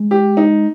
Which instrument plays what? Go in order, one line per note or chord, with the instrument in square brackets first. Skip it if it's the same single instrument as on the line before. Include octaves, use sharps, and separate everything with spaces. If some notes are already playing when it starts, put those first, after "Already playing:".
Already playing: [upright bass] G#3
[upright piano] G4
D#4